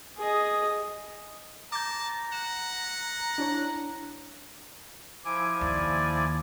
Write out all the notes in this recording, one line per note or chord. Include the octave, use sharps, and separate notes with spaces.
G#4 D#5
A5 A#5 D6 G6
F#5 E7
D4 E4 C#5
F3 E4 G#5 D6
D#2 D5